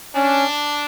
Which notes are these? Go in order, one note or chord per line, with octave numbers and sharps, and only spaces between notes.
C#4 D4